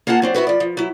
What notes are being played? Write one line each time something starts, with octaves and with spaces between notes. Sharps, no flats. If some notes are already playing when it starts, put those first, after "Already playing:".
A#3 F4 F#5 G#5 A5
F#3 C4 D4
B3 E4 F#4 B4
F3 D5
F3
F#3 E4